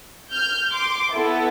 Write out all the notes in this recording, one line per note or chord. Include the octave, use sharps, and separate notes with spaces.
F6 G6
C6 D6
B3 E4 A4